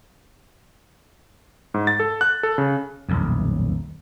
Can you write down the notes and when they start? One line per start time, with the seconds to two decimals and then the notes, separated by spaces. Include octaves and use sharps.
1.74 G#2
1.87 A6
2.00 A4
2.21 F#6
2.43 A4
2.58 C#3
3.09 D#1 B1 F2